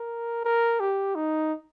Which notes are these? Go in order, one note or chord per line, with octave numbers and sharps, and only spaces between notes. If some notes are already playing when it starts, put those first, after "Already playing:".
Already playing: A#4
A#4
G4
D#4